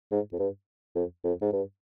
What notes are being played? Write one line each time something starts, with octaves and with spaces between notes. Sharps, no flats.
G#2
F2
G2
F2
F2
G#2
G2